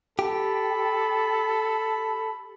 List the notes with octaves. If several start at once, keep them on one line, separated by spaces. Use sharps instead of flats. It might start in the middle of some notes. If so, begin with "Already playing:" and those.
G4 A4 B5